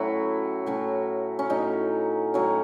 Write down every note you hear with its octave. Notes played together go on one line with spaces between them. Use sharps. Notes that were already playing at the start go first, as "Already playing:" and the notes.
Already playing: A2 F#3 C#4 E4 F#4
A2 F#3 C#4
C#4
A2 F#3 C#4 D#4
A2 F#3 C#4